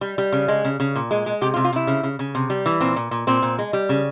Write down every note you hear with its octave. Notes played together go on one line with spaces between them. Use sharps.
G3
G3
C#3
G#3
C#3
C#3
A#2
G#3
G#3
C3 G4
F4
C3
F4
C3 E4
C#3
C#3
C#3
C3
G3
E3
A#2 C4
A#2
A#2
A#2 C4
A#2
G#3
G3
C#3